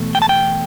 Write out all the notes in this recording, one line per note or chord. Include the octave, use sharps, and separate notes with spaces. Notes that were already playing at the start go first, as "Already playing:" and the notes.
Already playing: E2 B2 A3
G5
A5
G5